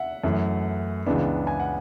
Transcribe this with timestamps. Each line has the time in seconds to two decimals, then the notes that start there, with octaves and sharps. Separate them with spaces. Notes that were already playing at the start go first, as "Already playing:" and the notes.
Already playing: E5 F#5
0.24 F#2 E3 A3
1.06 C#2 C#3 E3 B3 D4
1.47 G#5
1.60 F#5